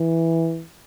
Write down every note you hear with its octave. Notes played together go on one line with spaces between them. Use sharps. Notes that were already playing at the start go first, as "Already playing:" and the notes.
Already playing: E3